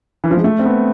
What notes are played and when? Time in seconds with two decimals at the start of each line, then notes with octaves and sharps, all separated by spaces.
0.24 E3
0.31 F3
0.37 G#3
0.44 A3
0.59 C4
0.65 B3